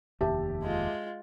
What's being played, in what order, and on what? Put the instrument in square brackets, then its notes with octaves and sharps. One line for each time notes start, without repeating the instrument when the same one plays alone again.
[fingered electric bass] F1 D#2 [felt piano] G4 E5 A5
[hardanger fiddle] G#3 F4